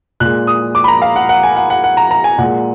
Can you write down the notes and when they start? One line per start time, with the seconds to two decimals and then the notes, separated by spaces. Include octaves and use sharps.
0.20 A#2 G#3 F#6
0.47 D#6
0.75 D6
0.84 B5
0.88 A#5
1.02 F5
1.16 F#5
1.29 F#5
1.43 G#5
1.56 F#5
1.70 F#5
1.84 F#5
1.97 A#5
2.11 A#5
2.24 G#5
2.38 A#2 G#3 F#5